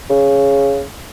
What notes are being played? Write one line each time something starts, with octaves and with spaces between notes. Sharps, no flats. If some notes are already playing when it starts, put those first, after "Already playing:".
C#3